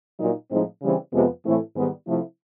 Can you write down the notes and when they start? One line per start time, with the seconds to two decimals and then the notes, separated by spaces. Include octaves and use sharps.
0.19 A#2 F#3 A#3 D#4
0.50 A2 F3 G#3 C4 D#4
0.82 C#3 E3 G3 C4
1.13 F2 C3 F3 G#3 B3
1.45 A2 E3 A3 C4 E4
1.76 G#2 D#3 G3 B3
2.08 C3 F3 A3 C4 E4